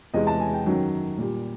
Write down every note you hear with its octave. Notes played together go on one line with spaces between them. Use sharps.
E2 C3 E3 G#3 D#5
A5
G#5
G5
F#2 D#3 F#3
A#2 G3